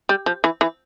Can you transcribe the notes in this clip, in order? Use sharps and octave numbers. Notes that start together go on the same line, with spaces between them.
G3
F3
E3
E3